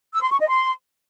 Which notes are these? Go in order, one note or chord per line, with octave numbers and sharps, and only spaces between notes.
E6
C6
C#6
D#5
C6